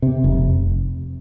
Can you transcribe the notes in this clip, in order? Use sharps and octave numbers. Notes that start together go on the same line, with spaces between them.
C3
F1